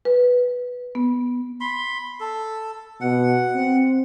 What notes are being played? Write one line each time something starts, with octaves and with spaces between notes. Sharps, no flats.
B4
B3
B5 C6
A4
B2 F#5
C4